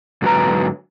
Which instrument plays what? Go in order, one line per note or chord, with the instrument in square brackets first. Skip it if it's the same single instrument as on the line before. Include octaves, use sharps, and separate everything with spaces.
[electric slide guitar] G#2 D3 F#3 G#4 B4 A#5